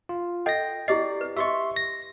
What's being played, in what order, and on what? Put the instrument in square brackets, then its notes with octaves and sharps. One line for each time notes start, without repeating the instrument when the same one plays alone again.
[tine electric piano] F4
[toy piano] A4 D#5 F#5 [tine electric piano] G5 A#6
[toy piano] E4 G4 D#5 [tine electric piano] D5 C7
[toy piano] B4
[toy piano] G4 D#5 [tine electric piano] E5 C6 C#6
[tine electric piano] A#6